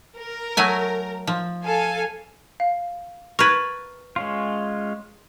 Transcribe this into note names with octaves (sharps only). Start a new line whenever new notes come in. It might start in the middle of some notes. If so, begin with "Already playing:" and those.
A#4
F#3 A3 G#5
F3
A4 F5 G#5
F5
A#4 B4 C#6 G#6 A6
G#3 C#4 F4